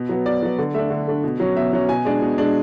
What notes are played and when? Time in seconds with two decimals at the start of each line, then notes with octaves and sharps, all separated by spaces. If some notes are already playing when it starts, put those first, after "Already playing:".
Already playing: B2
0.09 F#3 B3
0.26 B2 D5
0.43 F#3 B3
0.58 D3
0.74 A3 D4 E5
0.91 D3
1.08 A3 D4
1.24 B2
1.40 F#3 C#4
1.56 B2 E5
1.73 F#3 C#4
1.89 B2 G#5
2.05 G#3 D4
2.22 B2
2.38 G#3 D4